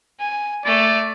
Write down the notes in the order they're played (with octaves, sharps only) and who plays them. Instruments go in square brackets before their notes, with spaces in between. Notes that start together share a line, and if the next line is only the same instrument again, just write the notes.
[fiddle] G#5
[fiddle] A3 [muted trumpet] D5